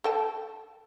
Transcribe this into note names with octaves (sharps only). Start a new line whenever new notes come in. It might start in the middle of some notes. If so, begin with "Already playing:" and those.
A4 G5 A5